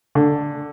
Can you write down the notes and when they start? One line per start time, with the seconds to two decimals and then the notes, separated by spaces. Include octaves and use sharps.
0.15 D3